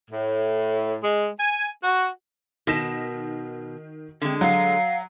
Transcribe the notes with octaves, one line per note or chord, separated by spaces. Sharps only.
A2
G#3
G#5
F#4
B2 D#3 A#6 E7
D3 G#3 C4
F#3 F5